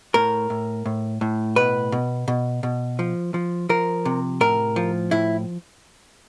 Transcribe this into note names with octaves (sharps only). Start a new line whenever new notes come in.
A2 A#4
A2
A2
A2
B2 B4
B2
B2
B2
F3
F3
F3 A#4
C3
A2 A#4
F3
A2 E4